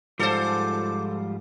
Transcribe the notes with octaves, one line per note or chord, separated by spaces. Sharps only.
G#2 F3 G3 F4 A4 C5 D6